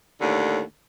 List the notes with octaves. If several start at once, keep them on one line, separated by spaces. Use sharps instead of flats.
D#2 A2 D3